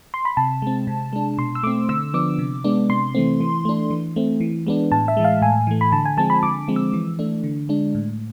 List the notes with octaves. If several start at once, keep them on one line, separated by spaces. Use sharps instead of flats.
C6
B5
C3 A5
G#3 C4
C3
G#3 D4
B2 C6
E6
A3 C4 D6
D3 E6
F3 B3 D4 D6
C3
G#3 B3 D4
C3 C6
E3 A3 C4
E3
A3 D4
E3
A3 C4
E3
G#3 B3 D4
A2 A5
E5
E3 G#3
F5
A2 G#5
E3 A3
B5
D3 A5
G#5
F3 G#3 C4 A5
B5
D3 D6
F3 G#3 C4
E6
E3
A3 D4
D3
G#3 D4
A2